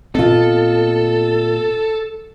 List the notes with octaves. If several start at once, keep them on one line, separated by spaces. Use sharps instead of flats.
A#2 B3 C4 F4 A4 D#5